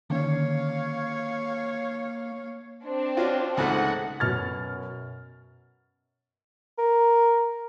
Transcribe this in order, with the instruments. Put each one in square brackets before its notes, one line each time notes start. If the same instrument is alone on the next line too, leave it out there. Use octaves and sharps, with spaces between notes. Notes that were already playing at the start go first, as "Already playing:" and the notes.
[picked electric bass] D3 D#3 C#4 [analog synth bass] A#3 [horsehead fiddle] C#5 F5
[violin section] C4 D4
[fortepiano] C#4 F4 F#4
[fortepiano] C#2 G#2 A3 [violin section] F#5
[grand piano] F#2 B2 F6 A6
[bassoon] A#4